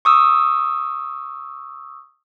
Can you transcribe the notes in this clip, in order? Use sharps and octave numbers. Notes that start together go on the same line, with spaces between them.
C#6 D#6 E6